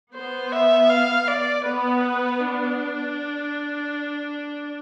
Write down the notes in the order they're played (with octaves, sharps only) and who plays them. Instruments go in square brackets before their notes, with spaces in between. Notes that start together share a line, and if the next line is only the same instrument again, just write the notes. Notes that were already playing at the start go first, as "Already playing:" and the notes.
[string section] B3 [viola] C5
[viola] E5
F5
D5
[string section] B3 [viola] B4
[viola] D4